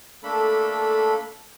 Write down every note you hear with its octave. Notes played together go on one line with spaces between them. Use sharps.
A3 A#3 D4 A4 B5